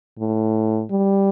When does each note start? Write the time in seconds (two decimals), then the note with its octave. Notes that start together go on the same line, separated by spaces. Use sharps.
0.19 A2
0.91 G3